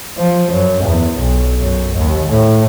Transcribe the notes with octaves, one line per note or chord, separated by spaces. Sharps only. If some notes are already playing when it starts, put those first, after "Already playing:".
F3
F#2
E2
B1
F#2
D#2
A2